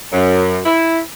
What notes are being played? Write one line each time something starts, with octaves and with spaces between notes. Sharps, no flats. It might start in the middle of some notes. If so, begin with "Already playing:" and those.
F#2
E4